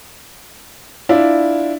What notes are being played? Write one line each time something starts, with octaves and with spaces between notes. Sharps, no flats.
D4 E4 F4